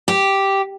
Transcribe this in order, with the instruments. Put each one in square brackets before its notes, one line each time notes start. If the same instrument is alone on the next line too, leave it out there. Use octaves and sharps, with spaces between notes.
[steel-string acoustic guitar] G4